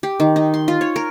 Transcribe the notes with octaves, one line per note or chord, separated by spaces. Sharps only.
G4
D#3
D#4
C6
F4
C#5
A#4